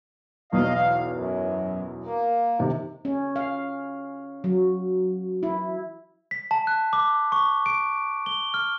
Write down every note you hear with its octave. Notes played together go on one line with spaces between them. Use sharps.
B1 E2 D#5 F5
F5
F#2
A#3
C3 D#3
C#4
F5
F#3
E4
B6
A5
F#6
D6
C#6
D7
G7
F6